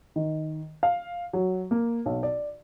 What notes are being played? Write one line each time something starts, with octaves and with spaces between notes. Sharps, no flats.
D#3
F5
F#3
A#3
B1
D5